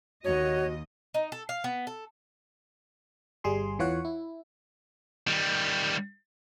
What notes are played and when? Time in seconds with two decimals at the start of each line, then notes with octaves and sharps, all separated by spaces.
0.25 D#2 F#4 C#5 D#5
1.14 D#4
1.32 A4
1.49 F5
1.64 B3
1.87 A4
3.44 G1 G3 G#4 C6
3.79 E2 E3 F4 C#5 F#5
4.05 E4
5.27 D#3 G3